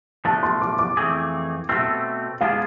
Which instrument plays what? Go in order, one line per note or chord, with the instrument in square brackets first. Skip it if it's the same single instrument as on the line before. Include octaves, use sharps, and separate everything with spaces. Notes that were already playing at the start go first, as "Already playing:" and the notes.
[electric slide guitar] F3 A3 D4 [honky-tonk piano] A5
[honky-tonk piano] C6
D6
D6
[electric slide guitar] F2 E3 A3 C4 G#4
[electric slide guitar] B2 A3 C4 [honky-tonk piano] E6
[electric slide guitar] G#3 B3 D4 F4 G#4 [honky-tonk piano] F5